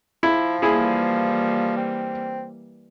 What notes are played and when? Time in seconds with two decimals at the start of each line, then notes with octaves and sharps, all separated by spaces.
0.23 F3 E4
0.62 E3 G3 A#3 E4 G#4
1.77 C4